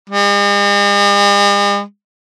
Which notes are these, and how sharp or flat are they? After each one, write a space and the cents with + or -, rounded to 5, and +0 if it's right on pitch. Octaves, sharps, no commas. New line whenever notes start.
G#3 -45